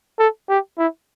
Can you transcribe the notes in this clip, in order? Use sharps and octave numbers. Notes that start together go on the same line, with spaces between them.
A4
G4
E4